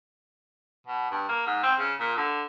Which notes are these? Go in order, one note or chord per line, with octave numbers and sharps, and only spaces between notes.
B2
G2
A#3
G#2
C4
C#3
A#2
D3